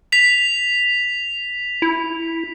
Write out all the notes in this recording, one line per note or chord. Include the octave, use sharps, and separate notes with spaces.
B6 F7
E4